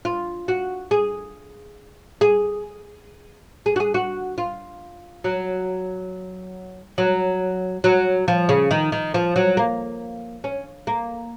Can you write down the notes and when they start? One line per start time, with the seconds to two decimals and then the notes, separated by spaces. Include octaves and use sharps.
0.05 F4
0.48 F#4
0.91 G#4
2.21 G#4
3.66 G#4
3.76 F#4
3.80 G#4
3.94 F#4
4.38 F4
5.24 F#3
6.98 F#3
7.84 F#3
8.28 F3
8.49 C#3
8.71 D#3
8.92 D#3
9.14 F3
9.36 F#3
9.57 A#3
10.44 C#4
10.87 A#3